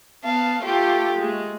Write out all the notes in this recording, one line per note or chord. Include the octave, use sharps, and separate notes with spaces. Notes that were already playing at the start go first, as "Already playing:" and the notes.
B3 F5 A5
A3 F4 G4
G#3 A3